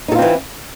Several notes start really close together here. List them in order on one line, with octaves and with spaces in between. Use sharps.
D#4 A4 F4 C4 E3